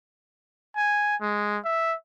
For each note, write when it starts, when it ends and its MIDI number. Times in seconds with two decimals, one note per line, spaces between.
0.76 1.16 80
1.22 1.58 56
1.65 1.95 76